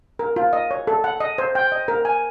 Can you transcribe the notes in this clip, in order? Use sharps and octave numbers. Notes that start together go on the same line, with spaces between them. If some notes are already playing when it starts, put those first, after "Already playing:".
A#4
F4
D#5
C#5
A4
F#5
D#5
C5
G5
D#5
A#4
G#5